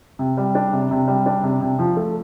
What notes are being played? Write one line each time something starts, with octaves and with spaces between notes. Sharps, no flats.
C3
G3
D4
C3
C3
G3
D4
C3
C3
F3
A3